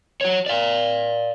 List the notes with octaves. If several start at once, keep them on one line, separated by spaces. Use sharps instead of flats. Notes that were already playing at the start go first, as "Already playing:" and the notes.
F#4 C#5
D5 F5